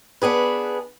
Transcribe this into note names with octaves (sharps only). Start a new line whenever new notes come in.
B3 D4 G#4 B4